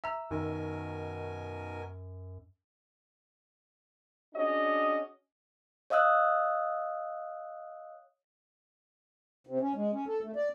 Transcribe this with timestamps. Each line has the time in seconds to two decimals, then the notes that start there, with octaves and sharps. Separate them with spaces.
0.04 E5 A#5 E6
0.31 F#2 B2 D#3 A#4 G#5
4.34 C#4 D4 F#4 G#4 C#5 D#5
5.90 C#5 D#5 F5 D#6 E6 F#6
9.47 C3
9.61 C#4
9.76 G#3
9.93 C#4
10.08 A4
10.24 A3
10.36 D5